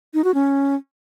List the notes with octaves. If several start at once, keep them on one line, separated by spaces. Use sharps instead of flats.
D#4
F#4
C#4